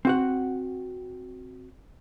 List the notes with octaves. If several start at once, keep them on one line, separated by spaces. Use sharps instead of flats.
C4 F#4 F#5